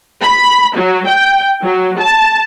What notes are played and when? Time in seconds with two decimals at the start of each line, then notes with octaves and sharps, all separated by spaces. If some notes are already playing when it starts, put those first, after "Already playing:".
0.22 B5
0.76 F#3
1.06 G5
1.63 F#3
1.99 A5